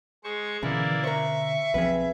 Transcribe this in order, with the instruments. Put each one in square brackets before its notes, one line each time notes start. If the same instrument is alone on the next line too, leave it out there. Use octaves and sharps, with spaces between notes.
[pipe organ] G#3 C5 C#6 [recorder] G#4
[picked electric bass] B2 D3 C#4 [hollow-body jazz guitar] E3 [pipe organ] A#3 E4 D5
[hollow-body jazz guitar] A#4 C5 [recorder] E5 [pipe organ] C#6
[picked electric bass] B1 F3 C4 [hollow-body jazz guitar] G#4 B4